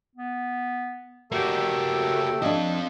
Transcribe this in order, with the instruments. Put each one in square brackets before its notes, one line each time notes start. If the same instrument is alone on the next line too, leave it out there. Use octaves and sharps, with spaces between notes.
[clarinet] B3
[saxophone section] F#3 A3 G4 [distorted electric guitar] A#3 F#4 [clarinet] E6
[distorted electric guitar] C4 F5 [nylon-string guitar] D4 D#5